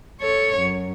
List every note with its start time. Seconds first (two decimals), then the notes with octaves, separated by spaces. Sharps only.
0.21 A4 C#5
0.58 F#2